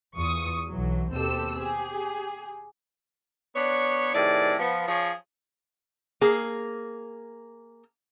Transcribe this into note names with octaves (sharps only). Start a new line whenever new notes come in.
E2 F4 C#6 D#6
B1 E3 F#3
D#2 B2 C4 G4 A4 E6
G4 G#4
B3 D4 C#5
A2 C3 D#3 G#4 D5
F3 B3
F3 G#4 C#5
A#3 G#4